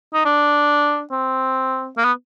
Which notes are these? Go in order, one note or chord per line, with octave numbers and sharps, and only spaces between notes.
D#4
D4
C4
A#3
B3